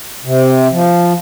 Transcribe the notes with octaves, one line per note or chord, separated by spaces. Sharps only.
C3
F3